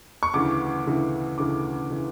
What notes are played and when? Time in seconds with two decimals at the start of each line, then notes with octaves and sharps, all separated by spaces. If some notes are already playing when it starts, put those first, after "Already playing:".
0.23 C#6
0.34 D2 C#3 E3 D6
0.86 D2 C#3 E3
1.38 D2 C#3 E3 D6
1.91 C#3 E3